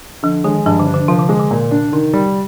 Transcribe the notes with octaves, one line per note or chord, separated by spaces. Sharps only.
D3 F3
D#3 G#3
G2 F3
D3
D4
D3
C3 F3
D3
D3 G#3
D3
A#2
D4
C3 D#3
G3